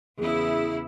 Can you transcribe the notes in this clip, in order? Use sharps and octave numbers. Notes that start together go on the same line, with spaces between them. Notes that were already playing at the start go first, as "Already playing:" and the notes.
E2 C#3 E4 G#4